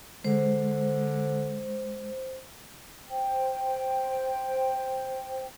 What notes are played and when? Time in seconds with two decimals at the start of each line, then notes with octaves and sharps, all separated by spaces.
0.25 D3 G#3 C5
3.08 C5 G5